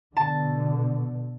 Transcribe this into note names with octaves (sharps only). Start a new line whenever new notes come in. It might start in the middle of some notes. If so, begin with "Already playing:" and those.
B2 D3 A5